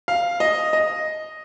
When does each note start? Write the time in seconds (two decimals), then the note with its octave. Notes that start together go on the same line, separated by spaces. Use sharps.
0.08 F5
0.40 D#5
0.73 D#5